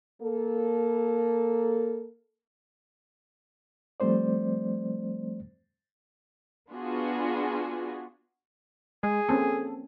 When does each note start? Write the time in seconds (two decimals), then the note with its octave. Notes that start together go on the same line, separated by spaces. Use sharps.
0.22 A#3 A4
4.00 F3 G3 A3 C4 C5 D5
6.70 B3 D4 F4 F#4 G#4
9.03 G#3 G#4
9.29 A#3 C4 C#4 A4